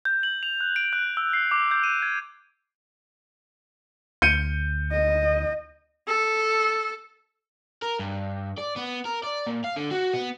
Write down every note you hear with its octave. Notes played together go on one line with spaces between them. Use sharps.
G6
F#7
F7
F#6
D7
F#6
E6
C7
D6
G6
D#7
G#6
D2 G6 C#7 D#7
D#5
A4
A#4
G2
D5
B3
A#4
D5
A#2
F5
D3
F#4
B3